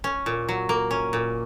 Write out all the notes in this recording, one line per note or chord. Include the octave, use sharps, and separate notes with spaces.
C#4
A#2
F#3
A#3
C#4
A#2